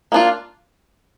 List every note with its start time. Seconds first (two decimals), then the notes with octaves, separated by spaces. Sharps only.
0.12 A#3 D4 F4